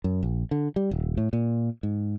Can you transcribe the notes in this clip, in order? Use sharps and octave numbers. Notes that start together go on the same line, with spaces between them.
F#2
A#1
D3
G3
D#1
A2
A#2
G#2